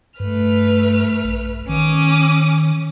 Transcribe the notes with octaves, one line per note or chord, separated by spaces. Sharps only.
G2 A3 B4 F6
A#1
D#3 C#4 D6 D#6